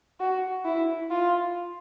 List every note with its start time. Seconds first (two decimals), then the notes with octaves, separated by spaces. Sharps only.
0.20 F#4
0.65 E4
1.11 F4